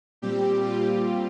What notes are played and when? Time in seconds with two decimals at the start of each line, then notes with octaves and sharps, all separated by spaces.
0.22 A#2 G3 C4 G4
0.65 F4